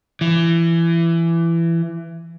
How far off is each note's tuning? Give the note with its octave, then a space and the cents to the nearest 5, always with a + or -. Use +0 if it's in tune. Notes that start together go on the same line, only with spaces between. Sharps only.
E3 +20